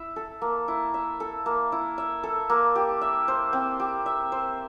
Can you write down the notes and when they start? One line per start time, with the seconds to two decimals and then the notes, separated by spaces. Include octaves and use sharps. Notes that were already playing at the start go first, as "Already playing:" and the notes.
Already playing: E4 E5
0.16 A4
0.42 A#3
0.68 E4
0.94 E5
1.20 A4
1.46 A#3
1.72 E4
1.98 E5
2.23 A4
2.50 A#3
2.75 G4
3.01 E5
3.28 C5
3.53 C4
3.80 G4
4.06 E5
4.32 C5